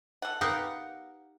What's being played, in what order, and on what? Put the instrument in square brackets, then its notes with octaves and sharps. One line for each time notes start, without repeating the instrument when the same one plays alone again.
[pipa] A4 F#5
[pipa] B3 F5 F#5 [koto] D#4 G4 A#4